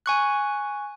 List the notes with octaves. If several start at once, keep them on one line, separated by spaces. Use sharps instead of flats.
G#5 C#6 F#6